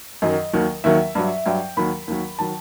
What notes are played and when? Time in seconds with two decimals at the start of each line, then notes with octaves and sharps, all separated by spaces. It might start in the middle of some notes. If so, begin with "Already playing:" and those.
0.22 F#2 D#3 F#3 D#5
0.53 D#2 D#3 F#3
0.84 D#2 D#3 F#3 E5
1.15 G2 F#3
1.46 G2 F#3 G5
1.77 D#2 D#3 F#3 B5
2.08 D#2 D#3 F#3
2.39 D#3 F#3 A5